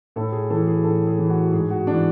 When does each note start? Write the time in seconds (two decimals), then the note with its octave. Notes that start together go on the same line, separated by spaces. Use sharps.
0.16 A2 A4
0.32 G#4
0.50 E3 A4
0.67 G#4
0.84 A2 A4
1.07 G#4
1.19 E3
1.30 F#4
1.53 G#2 G#4
1.70 F#4
1.87 E3 D4